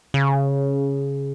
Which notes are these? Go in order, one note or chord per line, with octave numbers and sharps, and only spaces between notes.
C#3